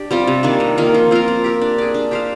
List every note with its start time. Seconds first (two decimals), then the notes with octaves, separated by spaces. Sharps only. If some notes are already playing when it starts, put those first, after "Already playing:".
Already playing: D4 G4 D5
0.11 G3 C4 F4
0.27 C3
0.43 D#3 A#3 D4
0.60 C3
0.78 D#3 A#3 F4
0.94 F3
1.11 C4 F4 A#4
1.28 C4
1.44 G4 A#4
1.61 D4
1.78 G#4 D5
1.94 D4
2.11 G4 C5 F5